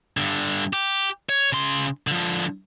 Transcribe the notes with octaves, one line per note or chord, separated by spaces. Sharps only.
G2 D3
G4
C#5
C#3 C6
D3 F3